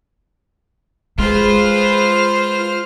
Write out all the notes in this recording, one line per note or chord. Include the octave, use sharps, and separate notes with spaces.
G#3 F4 G#4 B4 C5 F6